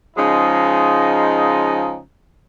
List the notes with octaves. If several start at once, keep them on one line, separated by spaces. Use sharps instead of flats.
C#3 F3 G#3 D#4